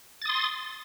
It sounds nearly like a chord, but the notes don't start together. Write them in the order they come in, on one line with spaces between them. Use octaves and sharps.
A6 D#6 C6